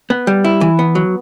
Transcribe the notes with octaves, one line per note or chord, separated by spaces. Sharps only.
B3
G3
E4
E3
B3
F#3